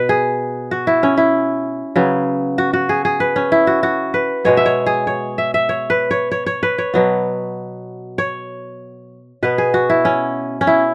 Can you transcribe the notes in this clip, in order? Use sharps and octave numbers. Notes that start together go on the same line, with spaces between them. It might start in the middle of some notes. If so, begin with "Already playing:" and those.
Already playing: B2 B3 B4
G#4
F#4
E4
C#4
E4
C#3 F#3 B3
F#4
F#4
G#4
G#4
B4
C#4
E4
F#4
F#4
B4
B2 G#3 B3 C#5
E5
C#5
G#4
C#5
E5
E5
C#5
B4
C#5
C#5
C#5
B4
C#5
B2 F#3 B3
C#5
B2 B3 B4
G#4
F#4
E4
C#4
C#4
E4